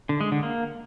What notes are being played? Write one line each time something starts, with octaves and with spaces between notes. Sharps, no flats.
D3
G#3
D3
A#3